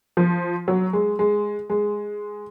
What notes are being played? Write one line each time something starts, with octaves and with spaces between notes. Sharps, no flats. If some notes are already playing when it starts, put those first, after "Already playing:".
F3
F#3
G#3
G#3
G#3